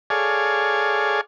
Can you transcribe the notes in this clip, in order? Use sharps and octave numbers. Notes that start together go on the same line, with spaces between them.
G#4 A4 C#5 D5 F5 G#5